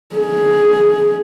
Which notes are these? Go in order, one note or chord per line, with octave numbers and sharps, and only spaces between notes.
G#4